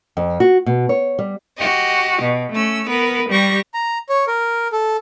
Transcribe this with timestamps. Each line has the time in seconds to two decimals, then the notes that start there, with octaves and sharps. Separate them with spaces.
0.17 F2
0.40 F#4
0.66 B2
0.89 C#5
1.19 G3
1.58 F#4 G4 D#5
2.22 B2
2.53 A3 C#4 E6
2.88 B3 A#4 B4
3.29 G3 G4 C#6 A#6
3.74 A#5
4.09 C#5
4.28 A#4
4.72 A4